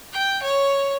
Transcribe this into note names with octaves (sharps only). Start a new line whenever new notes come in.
G5
C#5